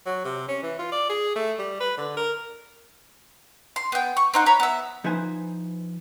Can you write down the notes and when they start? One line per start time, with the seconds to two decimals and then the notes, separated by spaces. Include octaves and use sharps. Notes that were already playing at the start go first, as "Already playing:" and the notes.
0.06 F#3
0.25 C3
0.48 C#4
0.63 E3
0.79 F4
0.92 D5
1.09 G#4
1.35 A3
1.59 G3
1.80 B4
1.97 D3
2.17 A#4
3.76 C6
3.92 B3 G5
4.17 C#6
4.34 C4 D#4 F#5
4.46 C#5 A#5 B5
4.60 B3 E5
5.04 F3 D#4 E4 B4 C5 G#5